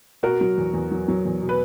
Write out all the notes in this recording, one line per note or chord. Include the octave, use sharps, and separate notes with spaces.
B2 F#4 A#4
F#3
E2
E2
F#3
F#3
E2
B2
B4